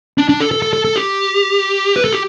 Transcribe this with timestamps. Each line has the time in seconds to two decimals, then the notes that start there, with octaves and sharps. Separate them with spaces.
0.18 D4
0.29 D4
0.40 A4
0.52 A4
0.62 A4
0.73 A4
0.85 A4
0.96 G4
1.96 B4
2.04 A4
2.12 G4